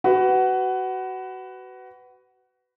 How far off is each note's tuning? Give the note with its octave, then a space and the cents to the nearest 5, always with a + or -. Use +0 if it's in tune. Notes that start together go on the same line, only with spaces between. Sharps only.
F#4 +20 B4 +15